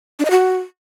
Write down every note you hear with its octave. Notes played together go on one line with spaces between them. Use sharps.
D4
D#5
F#4